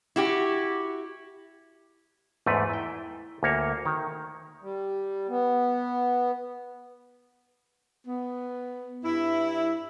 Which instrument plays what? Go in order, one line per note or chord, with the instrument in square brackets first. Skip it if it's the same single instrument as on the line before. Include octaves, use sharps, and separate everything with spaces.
[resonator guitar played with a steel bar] E4 F#4 G4
[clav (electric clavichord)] E2 G#2 A3 B4
E4 G5
D2 A#3 C#5
D#3
[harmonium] G3
B3
[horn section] B3
G2 E4